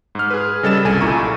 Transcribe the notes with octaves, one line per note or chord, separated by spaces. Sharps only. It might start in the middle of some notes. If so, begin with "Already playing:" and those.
G#2 F6
G#4 B4
C#3 G3 A4 D#5 A6 E7
G1 C2 A4 G#5 D#7
B1 A#2 E4 A#5 C#6 D#7